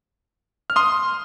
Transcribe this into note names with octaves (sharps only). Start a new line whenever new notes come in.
F6
C6 D#6